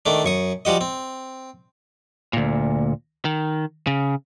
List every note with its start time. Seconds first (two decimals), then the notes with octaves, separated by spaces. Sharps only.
0.06 D#3 A3 D4
0.25 F#2 C#6 D#6
0.65 F3 G3 F#4 D#5
0.81 C4
2.33 D2 A#2
3.25 D#3
3.87 C#3